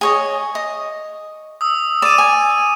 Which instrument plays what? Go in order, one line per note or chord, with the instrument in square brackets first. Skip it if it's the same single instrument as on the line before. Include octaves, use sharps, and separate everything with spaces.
[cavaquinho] G#4 C#5 D#5
D#5
[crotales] D#6 E6
[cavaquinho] D5 [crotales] D#7 E7
[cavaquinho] G#5